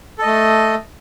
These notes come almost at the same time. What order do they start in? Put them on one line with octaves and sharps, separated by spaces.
A4 D#5 A3